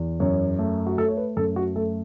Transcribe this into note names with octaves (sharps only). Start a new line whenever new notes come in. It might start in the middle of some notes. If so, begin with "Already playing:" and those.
Already playing: E2
F#2 C#5
A3
F#4
A3 A4
C#5
B4
F#2 A4
F#4
A3 A4